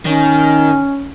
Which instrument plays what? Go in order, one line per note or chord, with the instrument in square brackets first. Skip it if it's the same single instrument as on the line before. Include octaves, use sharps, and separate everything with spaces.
[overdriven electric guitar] D#3 [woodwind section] C#4